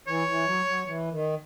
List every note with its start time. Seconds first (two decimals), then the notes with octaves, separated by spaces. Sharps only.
0.07 E3 C#5
0.27 E3
0.46 F#3
0.65 F#3
0.86 E3
1.11 D#3